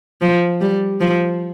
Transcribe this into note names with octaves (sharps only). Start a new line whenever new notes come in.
F3
G3
F3